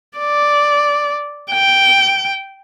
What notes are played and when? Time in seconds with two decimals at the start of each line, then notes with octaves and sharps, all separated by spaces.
0.18 D5
1.52 G5